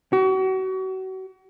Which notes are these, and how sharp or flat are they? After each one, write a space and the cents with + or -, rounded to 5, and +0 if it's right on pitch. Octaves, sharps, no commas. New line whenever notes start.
F#4 +35